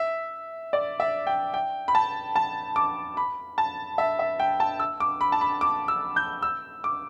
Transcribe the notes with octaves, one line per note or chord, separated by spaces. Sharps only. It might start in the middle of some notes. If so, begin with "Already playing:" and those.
Already playing: E5
D5
E5
G5
G5
B5
A5
A5
D6
B5
A5
E5
E5
G5
A5
E6
D6
B5
A5
B5
D6
E6
G6
E6
D6